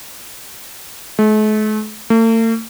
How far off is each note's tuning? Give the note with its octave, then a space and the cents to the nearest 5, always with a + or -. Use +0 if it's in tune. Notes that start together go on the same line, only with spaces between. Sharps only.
A3 -45
A3 +45